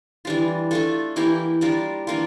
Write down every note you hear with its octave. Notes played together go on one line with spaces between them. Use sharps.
E3 G3 D4 F4
A3 D4 F4 A4
E3 A#3 E4 G4
G3 D4 F4 A#4
E3 A#3 D4 F4